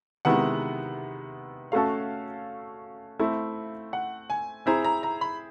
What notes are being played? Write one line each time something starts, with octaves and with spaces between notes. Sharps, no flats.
C3 D#3 G#3 B3 E4 F#5
A3 C#4 F#4 A4 F5
A3 C4 E4
F#5
G#5
C4 E4 G#4 C5 A#5
A#5
A#5
B5